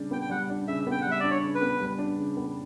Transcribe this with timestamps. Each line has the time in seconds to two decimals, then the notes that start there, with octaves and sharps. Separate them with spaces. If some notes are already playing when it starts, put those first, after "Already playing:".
Already playing: C#3 G3 D4
0.11 B3 G5
0.21 G5
0.30 G3 F#5
0.50 D4
0.68 C#3 E5
0.87 B3 G5
1.01 G3 F#5
1.11 E5
1.20 D4 D5
1.31 C#5
1.43 C#3
1.55 B4
1.61 B3
1.80 G3
1.99 D4
2.18 C#3
2.37 B3